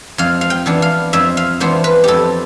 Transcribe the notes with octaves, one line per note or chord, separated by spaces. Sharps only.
F2 F5
F5
G5
E3 B3 D4
F5
F2 E5
F5
E3 B3 D4 C5
B4
F2 G4 A4